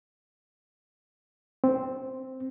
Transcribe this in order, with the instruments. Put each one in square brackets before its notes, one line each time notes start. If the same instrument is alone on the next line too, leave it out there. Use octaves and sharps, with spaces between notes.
[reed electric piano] C4